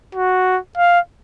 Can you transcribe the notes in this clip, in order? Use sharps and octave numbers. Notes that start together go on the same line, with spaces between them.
F#4
F5